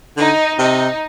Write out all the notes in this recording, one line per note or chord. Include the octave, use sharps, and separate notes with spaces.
D3 D#4
C3 D#4